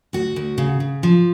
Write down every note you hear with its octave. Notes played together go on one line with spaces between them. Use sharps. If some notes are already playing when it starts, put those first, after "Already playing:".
D2 F#4
D2
C#3
C#3
F3